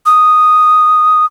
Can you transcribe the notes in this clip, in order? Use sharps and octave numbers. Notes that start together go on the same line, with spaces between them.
D#6